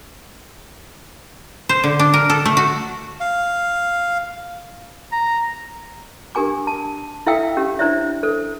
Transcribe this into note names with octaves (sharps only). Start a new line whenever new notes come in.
C5
D3
D4
A#4
A4
A3
F#4
F5
A#5
D4 G4 A#4 G#5 D6
A5
E4 A4 E5 F5 G5 E6
C#4 G4
D4 E4 C5 C#5 E5
A4 C5